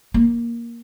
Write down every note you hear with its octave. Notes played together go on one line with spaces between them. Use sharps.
A#3